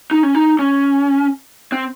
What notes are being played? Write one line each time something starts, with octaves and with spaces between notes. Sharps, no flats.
D#4
C#4
D#4
C#4
C4